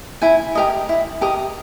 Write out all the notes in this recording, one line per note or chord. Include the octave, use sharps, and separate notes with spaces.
E4 G#5
G4 A#4 D#5
E4
G4 A#4 D#5